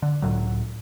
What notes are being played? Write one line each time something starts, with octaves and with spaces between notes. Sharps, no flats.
D3
C#2 A2 F#3